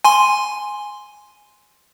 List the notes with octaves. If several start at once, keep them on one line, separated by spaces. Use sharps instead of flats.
G#5 C6